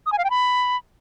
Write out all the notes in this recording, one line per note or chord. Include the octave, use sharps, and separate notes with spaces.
D#6
G#5
F5
G5
B5